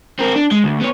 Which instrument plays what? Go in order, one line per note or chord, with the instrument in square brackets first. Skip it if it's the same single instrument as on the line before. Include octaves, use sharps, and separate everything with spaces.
[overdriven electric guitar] C4 A#4
D4
G#3
D2
B3 C#5